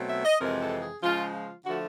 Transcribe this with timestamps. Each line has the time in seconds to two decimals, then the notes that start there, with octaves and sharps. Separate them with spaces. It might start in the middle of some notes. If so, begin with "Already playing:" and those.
Already playing: B2 F#3 A3 C4
0.09 E5
0.25 D#5
0.40 F2 C3 E3 G#3 C4 A#4
0.61 A4
0.82 G#4
1.03 C#3 F3 G#3 F4
1.34 F4
1.66 D3 F3 A3 F#4